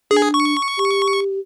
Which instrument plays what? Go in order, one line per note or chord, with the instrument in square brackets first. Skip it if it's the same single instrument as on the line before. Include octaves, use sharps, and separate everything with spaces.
[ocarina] D4 [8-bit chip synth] G#4
[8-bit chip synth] C#6
[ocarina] G4